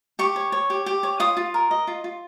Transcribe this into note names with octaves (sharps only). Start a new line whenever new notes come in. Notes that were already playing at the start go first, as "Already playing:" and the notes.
G4 C#6
C#5
C#5
G4
G4
C#5
F4 D#6
F4
A#4
D#5
F4
F4